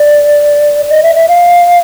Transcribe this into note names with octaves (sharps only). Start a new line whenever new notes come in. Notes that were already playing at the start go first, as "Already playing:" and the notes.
Already playing: D5
D#5
E5
E5
F5